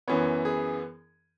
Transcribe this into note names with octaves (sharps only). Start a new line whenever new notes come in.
F#2 E3 B3 C#5
G#4